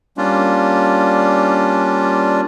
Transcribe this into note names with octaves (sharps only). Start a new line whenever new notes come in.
G3 A#3 C#4 D4 F4